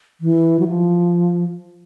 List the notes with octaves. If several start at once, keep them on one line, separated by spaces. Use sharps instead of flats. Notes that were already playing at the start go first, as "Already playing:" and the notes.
E3
F#3
F3